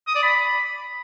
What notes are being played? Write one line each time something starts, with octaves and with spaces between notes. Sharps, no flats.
D#6
D5
B5